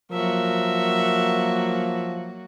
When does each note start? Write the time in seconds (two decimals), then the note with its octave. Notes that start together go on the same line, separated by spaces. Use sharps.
0.12 F3 F#3 A#3 F#4 A#4 E5